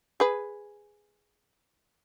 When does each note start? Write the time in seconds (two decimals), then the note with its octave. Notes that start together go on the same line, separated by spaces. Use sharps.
0.20 G#4 B4